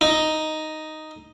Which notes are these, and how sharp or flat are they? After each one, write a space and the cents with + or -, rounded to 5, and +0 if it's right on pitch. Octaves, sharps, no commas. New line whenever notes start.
D#4 +0